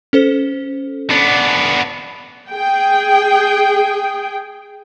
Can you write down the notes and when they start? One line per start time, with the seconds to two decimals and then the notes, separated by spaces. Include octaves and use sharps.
0.13 C#4 A4 C5
1.10 B3 D4
2.50 G#4 G5